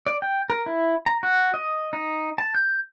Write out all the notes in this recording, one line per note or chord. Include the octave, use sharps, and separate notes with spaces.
D5
G5
A#4
E4
A#5
F#4
D#5
D#4
A5
G6